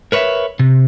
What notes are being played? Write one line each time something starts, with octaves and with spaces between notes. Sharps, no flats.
A#4 B4 C#5 D#5 E5
C3